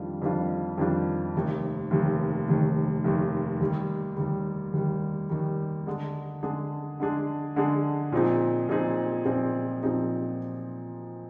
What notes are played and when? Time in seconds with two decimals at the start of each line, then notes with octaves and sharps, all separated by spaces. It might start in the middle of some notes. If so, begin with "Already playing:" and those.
Already playing: F2 D#3 G3 D4 F4
0.22 F2 D#3 G3 D4 F4
0.78 F2 D#3 G3 D4 F4
1.35 F1 D#2 D#3
1.91 F1 D#2 D#3
2.48 F1 D#2 D#3
3.04 F1 D#2 D#3
3.60 D#2 D#3 G3
4.17 D#2 D#3 G3
4.73 D#2 D#3 G3
5.30 D#2 D#3 G3
5.87 D3 G#3 D4 G#4
6.43 D3 G#3 D4 G#4
7.00 D3 G#3 D4 G#4
7.56 D3 G#3 D4 G#4
8.12 A#2 F3 C4 D#4 G#4
8.68 A#2 F3 C4 D#4 G#4
9.25 A#2 F3 C4 D#4 G#4
9.82 A#2 F3 C4 D#4 G#4